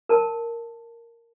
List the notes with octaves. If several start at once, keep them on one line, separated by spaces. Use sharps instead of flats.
A#4 A5